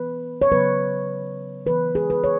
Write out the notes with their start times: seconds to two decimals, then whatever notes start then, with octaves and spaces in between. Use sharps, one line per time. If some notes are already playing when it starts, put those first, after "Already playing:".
Already playing: E3 B3 B4
0.42 C#5
0.52 C#3 F#3 B3 B4
1.66 E3 B3 B4
1.95 G#4
2.10 B4
2.24 C#5